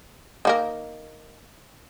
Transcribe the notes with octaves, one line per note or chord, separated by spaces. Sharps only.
D#3 A#3 A#4